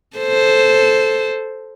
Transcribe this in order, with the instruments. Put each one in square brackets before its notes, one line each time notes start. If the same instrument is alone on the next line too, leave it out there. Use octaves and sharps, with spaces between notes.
[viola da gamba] A4 C5